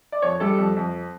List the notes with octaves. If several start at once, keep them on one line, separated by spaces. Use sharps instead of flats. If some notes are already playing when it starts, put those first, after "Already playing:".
D5
F2 C#5
G3 A4
F2
F2